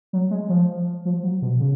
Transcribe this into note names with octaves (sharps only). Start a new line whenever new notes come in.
F#3
G#3
F3
F3
F#3
B2
C#3